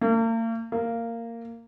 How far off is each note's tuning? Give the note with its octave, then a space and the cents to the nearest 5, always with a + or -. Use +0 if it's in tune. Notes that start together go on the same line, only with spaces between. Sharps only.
A#3 -45
A#3 -15